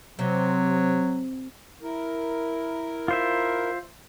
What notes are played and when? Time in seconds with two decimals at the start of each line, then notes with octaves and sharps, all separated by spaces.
0.19 C3 F#3
1.81 E4 A#4
3.08 F4 C5 E5